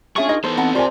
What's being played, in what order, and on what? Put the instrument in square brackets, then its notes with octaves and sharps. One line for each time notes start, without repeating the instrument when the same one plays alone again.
[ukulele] C#4 E5 G#5 [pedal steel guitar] D4 F4 C#6 [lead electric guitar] G#4
[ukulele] D#4 A#4 D#5
[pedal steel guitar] E3 B3 D#4 [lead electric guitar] A4 B4 [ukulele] C5
[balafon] C4 B5 [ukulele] D#5 F#5 A5
[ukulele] F4 A#4 G#5 [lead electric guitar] G4 C5 [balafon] D5 A5